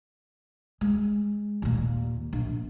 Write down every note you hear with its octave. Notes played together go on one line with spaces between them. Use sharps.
G#3
D#2 A#2
A#1